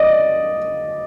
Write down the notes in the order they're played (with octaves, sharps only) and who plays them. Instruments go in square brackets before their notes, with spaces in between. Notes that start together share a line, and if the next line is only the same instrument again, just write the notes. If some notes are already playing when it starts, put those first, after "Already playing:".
Already playing: [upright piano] D5 D#5